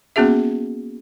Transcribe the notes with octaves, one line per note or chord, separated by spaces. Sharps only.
A#3 B3 C#4 F#4 G#4 E5